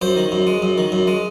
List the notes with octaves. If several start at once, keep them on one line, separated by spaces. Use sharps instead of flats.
F#2 C5
D#3
F#2
G#3
F#2
D#3
F#2
G#3